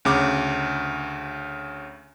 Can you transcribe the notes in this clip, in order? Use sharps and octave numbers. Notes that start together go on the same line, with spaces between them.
D2 C#3 D6